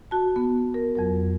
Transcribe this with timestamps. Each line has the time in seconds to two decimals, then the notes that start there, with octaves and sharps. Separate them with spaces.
0.11 F#4 A5
0.36 B3
0.74 A#4
0.95 F2 F#3 A#4